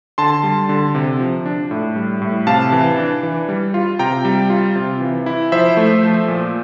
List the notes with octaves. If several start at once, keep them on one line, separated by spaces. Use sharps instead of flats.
D3 A5 C6
G3
D3
C3
F3
D4
A2
G3
A2
C3 F5 A5
E3
D4
E3
G3
F4
C3 G5 A#5
G3
F4
C3
E3
E4
F3 C5 E5
A3
F3
A#2